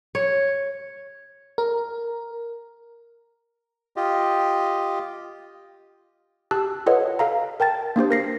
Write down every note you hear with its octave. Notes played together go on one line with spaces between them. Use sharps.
C#5
A#4
F4 G4 D#5
G4 A5 E6 F#6
F4 A4 B4 C#5 D#5 F#5
A4 F5 A#5
A#4 G5 A5 A6
A#3 D4 G4 C5
A#4 A#6 C7